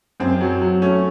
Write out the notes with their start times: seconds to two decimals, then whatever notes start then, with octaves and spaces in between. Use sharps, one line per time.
0.20 F#2 C4
0.41 F#3
0.61 F#3
0.82 A3 C#4